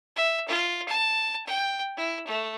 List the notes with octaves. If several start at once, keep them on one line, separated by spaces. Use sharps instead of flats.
E5
F4
A5
G5
E4
A3